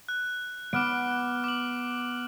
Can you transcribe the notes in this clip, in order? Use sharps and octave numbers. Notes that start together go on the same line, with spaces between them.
F#6
B3 D6 F6 D7
D6 F#7